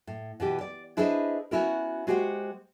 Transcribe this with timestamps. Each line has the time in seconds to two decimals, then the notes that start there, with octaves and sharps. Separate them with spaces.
0.07 A2
0.40 B2 E3 G4
0.61 D5
0.97 D4 E4 G#4 B4 C5 D#5
1.51 B3 C#4 E4 F#4 A#4
2.07 G#3 F#4 G4 C5 F#5